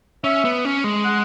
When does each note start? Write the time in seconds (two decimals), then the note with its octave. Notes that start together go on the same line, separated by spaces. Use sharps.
0.24 C#4 E5
0.45 B3
0.65 C#4
0.84 G#3
1.04 F#5